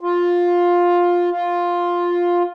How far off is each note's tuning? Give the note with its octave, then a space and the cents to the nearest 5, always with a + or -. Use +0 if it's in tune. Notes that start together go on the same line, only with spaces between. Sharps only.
F4 +10
F4 +5